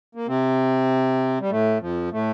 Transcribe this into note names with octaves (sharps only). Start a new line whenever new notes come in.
A#3
C3 C4
G3
A2 A3
F2 F3
A2 A3